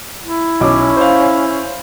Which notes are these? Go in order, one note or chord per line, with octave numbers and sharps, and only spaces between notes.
E4
B1 C#4 D#5 D6
C5 F5